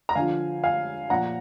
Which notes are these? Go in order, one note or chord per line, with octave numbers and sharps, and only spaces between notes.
A#5
D3 F3 F5 G#5
F5 G#5
A#2 F3 F#5 A#5